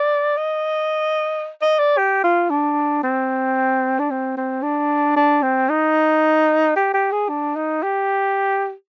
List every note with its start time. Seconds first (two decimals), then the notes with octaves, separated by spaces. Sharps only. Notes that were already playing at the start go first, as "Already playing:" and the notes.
Already playing: D5
0.37 D#5
1.62 D#5
1.79 D5
1.97 G4
2.24 F4
2.50 D4
3.03 C4
3.99 D4
4.10 C4
4.37 C4
4.62 D4
5.16 D4
5.42 C4
5.69 D#4
6.76 G4
6.94 G4
7.12 G#4
7.29 D4
7.56 D#4
7.83 G4